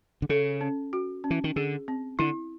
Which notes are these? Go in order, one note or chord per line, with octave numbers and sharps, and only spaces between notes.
D3
C#3 A4
C#4
F#4
C#4
E3
D#3
D3 G#4
C4
D3 E4